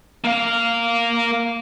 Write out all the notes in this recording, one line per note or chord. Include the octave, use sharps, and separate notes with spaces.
A#3 F5